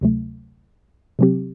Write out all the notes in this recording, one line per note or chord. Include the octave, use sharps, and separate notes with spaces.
D2 C3 F#3 A3
C3 F#3 C4 G4